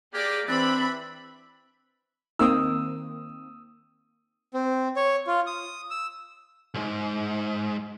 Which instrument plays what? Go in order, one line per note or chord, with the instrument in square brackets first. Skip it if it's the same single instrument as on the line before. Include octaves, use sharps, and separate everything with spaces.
[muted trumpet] A#3 [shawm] G4 [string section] G#4 D5
[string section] E3 B5 [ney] C4 [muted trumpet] D4 [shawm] E5
[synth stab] D#3 A#3 C4 [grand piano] D#6 E6
[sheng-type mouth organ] C4
C#5
F4
D#6
E6
[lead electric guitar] B1 G#2